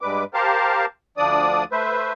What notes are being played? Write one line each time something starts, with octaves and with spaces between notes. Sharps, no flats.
G2 G3 G#3 B4 D6
G4 A#4 C5 F5 A5
D2 F3 D4 D5 D#6
A3 B4 C5 E5